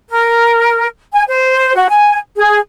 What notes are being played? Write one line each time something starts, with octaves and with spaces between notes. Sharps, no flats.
A#4
G#5
C5
F#4
G#5
G#4